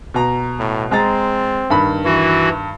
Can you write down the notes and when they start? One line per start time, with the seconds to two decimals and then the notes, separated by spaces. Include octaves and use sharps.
0.14 B2 A#5
0.59 A2
0.91 G#3 C4 A#5 A6
1.70 G2 D#3 B5
2.05 E3 E4 F#4